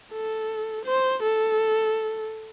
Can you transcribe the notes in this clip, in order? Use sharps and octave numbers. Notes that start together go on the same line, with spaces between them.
A4
C5
A4